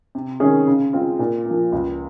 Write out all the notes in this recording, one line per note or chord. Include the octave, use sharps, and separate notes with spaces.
C3
D#3 G#3 C#4 G#4
C#3
G#3 C4 F4
A#2
F3 A#3
C#2